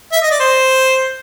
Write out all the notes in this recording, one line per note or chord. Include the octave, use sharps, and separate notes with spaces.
E5
D#5
D5
C5